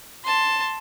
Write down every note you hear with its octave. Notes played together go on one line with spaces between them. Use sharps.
A5 C6